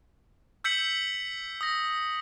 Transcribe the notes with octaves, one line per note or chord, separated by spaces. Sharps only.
E6 G6 B6 C#7 F#7
D#6 A#6